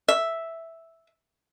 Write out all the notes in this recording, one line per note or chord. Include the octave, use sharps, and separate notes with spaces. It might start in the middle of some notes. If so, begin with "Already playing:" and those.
E5